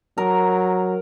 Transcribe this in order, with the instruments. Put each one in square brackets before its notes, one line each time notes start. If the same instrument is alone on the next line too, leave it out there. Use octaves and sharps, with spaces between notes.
[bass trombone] F#3 [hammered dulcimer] A#4